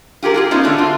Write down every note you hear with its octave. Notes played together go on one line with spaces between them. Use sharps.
F4 G4 G#4 A#4
F4 F#4 G#4
B3 C#4 D#4 F4
D3 A3 D4 F#4
C4 F4